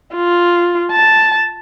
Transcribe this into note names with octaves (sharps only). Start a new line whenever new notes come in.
F4
A5